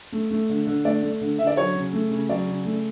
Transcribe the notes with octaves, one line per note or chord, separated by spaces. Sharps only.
A3
A3
D3
D3
A3 D5
A3
D3
D3 E5
D5
F#3 C#5
C#3
A3
C#3
F#3 D5
C#3
A3